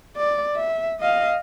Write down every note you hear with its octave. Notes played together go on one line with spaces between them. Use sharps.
D5
E5
D#5 F5